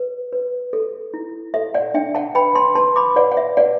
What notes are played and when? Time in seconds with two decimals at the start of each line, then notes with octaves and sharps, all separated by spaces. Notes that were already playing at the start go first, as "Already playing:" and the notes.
Already playing: B4
0.32 B4
0.73 A4
1.14 E4
1.54 A4 E5
1.74 D5 F#5
1.94 D4 E5 G5
2.15 F#5 A5
2.35 B4 G5 B5
2.55 A5 C6
2.75 B4 A5 C6
2.96 B5 D6
3.16 B4 D5 F#5
3.32 F#5
3.37 E5
3.57 B4 D5 F#5